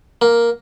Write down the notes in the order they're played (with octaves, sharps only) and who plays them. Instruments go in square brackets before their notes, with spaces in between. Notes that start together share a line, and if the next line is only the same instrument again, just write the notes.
[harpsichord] A#3